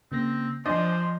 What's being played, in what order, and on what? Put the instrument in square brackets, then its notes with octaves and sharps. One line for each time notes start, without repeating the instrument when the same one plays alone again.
[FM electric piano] C#3 A#3 A#6 [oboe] C4
[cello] F3 [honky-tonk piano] D4 D#5 [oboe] C5 [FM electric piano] G#5 C6